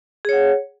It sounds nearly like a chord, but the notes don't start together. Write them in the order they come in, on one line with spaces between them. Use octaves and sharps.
G#4 C#5 F#5